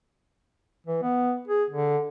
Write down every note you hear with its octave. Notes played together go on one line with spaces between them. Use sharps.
E3
B3
G#4
D3